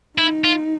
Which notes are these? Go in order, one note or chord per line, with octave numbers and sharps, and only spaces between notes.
D#4 E4
F4